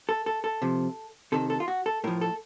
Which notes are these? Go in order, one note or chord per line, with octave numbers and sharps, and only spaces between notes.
A4
A4
A4
C3 F3
C3 D#3 A4
A4
F4
F#4
A4
A2 F3 A#4
A4